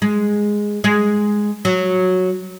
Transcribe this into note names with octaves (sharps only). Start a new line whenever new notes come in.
G#3
G#3
F#3